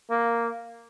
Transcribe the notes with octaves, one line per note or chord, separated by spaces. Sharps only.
A#3